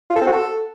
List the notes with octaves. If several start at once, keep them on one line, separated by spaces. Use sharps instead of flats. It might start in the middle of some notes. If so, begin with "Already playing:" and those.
F4
A4
C4
F#4
A4